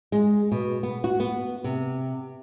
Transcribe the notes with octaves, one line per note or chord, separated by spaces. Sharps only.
G#3
B2
B3
F#4
B3
C3